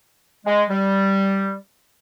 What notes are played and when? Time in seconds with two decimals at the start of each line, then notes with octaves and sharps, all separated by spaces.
0.46 G#3
0.69 G3